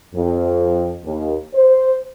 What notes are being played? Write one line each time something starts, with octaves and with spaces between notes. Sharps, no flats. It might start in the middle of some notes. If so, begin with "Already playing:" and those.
F2
D#2
C5